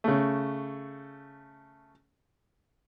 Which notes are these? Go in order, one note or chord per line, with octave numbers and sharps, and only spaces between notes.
C#3 A3